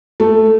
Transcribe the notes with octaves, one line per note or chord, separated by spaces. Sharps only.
A3